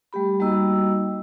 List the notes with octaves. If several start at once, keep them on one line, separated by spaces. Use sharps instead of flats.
G3 A3 G4 B5
G3 A#3 D#4 F#4 D#5 E6